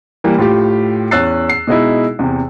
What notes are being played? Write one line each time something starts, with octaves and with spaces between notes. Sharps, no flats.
E3 G3 A#3
A2 F4 G4
E2 C#4 E6 F#6 A6 C7
C7
B2 G#3 D#4 E4
E2 C3